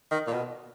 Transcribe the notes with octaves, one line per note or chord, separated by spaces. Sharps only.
D#3
A#2
B2